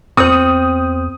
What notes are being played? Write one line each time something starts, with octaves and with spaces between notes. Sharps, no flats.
E2 C4 C5 D#6